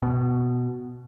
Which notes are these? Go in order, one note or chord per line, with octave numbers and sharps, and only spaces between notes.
B2